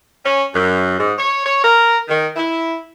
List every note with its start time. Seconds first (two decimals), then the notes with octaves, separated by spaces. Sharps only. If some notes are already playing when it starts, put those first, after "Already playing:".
0.24 C#4
0.53 F#2
0.97 G#2
1.18 C#5
1.45 C#5
1.61 A#4
2.08 D#3
2.35 E4